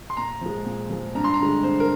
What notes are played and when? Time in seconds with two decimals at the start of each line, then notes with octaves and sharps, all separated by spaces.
0.10 C6
0.17 A#2 A#5
0.41 F3 G#3
0.66 A#2
0.90 F3 G#3
1.15 G2 A#5
1.24 C6
1.34 A#5
1.40 D3 G#3
1.63 G2 C5
1.80 A#4